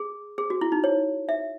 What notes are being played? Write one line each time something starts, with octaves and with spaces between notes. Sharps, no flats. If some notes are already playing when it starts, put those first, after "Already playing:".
Already playing: G#4
G#4
F#4
E4
D#4
C#5
E5